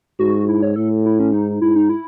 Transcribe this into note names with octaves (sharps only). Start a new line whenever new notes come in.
G#2 F#4
E4
C#5
A2 A4
E4
C#4
G#2 D#4
G#2 E4
D#4
E4